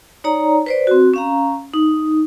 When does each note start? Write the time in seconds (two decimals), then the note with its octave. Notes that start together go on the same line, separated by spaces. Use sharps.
0.24 D#4 C#5 D5 A#5
0.66 B4 C5 D5
0.87 C4 F#4
1.14 C#4 F5 A#5
1.74 D#4